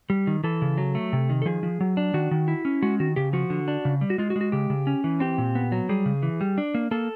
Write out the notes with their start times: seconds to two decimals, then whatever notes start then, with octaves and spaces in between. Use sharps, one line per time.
0.10 G3
0.27 D#3
0.44 E3 A4
0.62 C#3
0.78 F#3
0.95 A3
1.13 C3
1.29 D#3
1.42 A4
1.46 F3 G#4
1.63 F3
1.81 F#3
1.97 D4
2.14 D#3 F#4
2.31 D#3
2.48 E4
2.65 C#4
2.83 G#3 F#4
3.00 D#3 F#4
3.16 C#3 G4
3.33 F3 F#4
3.50 D3
3.68 D4
3.85 C#3
4.01 G3
4.10 F#4
4.18 G#3 F4
4.30 F#4
4.36 G#3
4.41 F#4
4.52 C#3 G4
4.70 C#3
4.87 C#4
5.04 E3
5.20 C4 G4
5.38 A#2
5.55 B3
5.72 F#3
5.89 G3 G#4
6.06 C#3
6.23 E3
6.41 G3
6.58 D4
6.75 A#3
6.91 A#3 A4